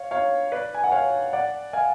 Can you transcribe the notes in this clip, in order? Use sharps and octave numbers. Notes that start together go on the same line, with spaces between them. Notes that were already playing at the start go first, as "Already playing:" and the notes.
Already playing: C#5 F5
C#5 F5
B4 D5
G#5
F#5
C#5 F5
D5 F#5
F5 G#5